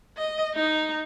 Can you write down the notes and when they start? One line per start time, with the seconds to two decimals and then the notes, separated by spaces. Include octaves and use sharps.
0.17 D#5
0.55 D#4